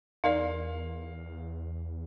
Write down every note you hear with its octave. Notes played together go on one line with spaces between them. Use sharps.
E2 D#4 A#4 D5 F5